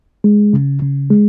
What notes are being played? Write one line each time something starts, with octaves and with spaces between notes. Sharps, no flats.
G#3
C#3
C#3
G#3